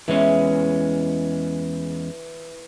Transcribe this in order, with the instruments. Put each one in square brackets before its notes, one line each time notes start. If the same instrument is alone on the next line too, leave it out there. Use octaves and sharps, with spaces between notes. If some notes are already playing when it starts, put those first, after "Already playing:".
[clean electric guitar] E2 G#3 C#4 [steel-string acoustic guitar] E3